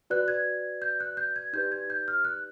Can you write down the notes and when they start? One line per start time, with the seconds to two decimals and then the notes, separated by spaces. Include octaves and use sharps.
0.10 F#4 B4 D5 F#6
0.28 G#6
0.82 G6
1.00 F#6
1.17 G6
1.36 G#6
1.53 D#4 G4 B4 D5 G6
1.72 G#6
1.90 G6
2.08 F6
2.25 F#6